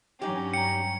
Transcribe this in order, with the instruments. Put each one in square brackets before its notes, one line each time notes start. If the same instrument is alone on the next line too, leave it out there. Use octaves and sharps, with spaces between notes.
[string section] G2 F#3 C#4 [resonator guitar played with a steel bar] D#4 G4
[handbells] G5 A#5 [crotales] C#7